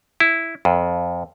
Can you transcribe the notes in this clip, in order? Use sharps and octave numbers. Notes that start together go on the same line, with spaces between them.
E4
F2